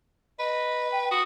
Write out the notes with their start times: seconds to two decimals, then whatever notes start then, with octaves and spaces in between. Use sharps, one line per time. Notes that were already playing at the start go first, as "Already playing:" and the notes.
0.39 B4 D#5
0.92 G5
1.11 F#4 D#6